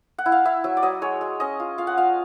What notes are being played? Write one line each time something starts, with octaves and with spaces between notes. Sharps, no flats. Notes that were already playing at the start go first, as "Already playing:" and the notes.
F#5
E4
F5
E4 E5
F#3 E5
D5
F#3 D#5
G#3 C#5
G#3
C#4 D#5
F4
F4 F5
F#5
F4 F5